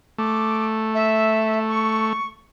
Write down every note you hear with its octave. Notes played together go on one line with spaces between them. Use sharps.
A3 D6
E5
C#6